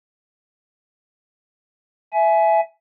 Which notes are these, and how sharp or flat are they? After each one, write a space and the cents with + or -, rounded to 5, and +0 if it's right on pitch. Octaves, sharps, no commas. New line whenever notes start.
E5 +5 G#5 +25